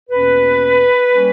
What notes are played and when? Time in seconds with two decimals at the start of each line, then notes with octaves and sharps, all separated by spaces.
0.10 E2 B2 A#3 C#4 B4
1.12 G3 A#3 C#4